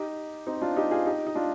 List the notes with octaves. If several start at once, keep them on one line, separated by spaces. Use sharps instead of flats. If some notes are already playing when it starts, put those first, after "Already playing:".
Already playing: D#4 G4
C4 D#4
D4 F4
D#4 G4
F4 G#4
D#4 G4
D#4
D4 F4